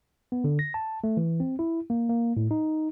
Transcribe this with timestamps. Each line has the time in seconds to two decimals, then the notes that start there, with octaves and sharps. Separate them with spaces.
0.32 B3
0.44 D3
0.59 A#6
0.74 A5
1.04 A3
1.17 E3
1.40 C4
1.59 E4
1.90 A#3
2.09 A#3
2.37 A2
2.51 D#4